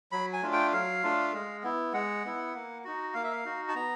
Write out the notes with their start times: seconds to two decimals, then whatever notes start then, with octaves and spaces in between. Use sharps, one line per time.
0.12 F#3 B5
0.33 G#5
0.42 A3 D4 F4
0.53 G5
0.73 F#3 F5
1.03 A3 D4 F4
1.33 G#3
1.63 B3 E4
1.93 G#3 F#5
2.24 B3 E4
2.54 A#3
2.84 D#4 F#4
3.14 A#3 F5
3.24 E5
3.31 F5
3.45 D#4 F#4
3.69 A5
3.75 B3 A#5